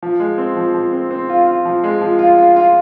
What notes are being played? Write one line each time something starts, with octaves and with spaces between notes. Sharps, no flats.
F3
G#3
C4
F3
F3
C4
C4
F4
F4
F3
G#3
F3
F4
F4
F4